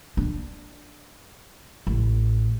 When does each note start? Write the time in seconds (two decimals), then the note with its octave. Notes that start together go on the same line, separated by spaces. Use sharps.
0.17 D4
1.87 A1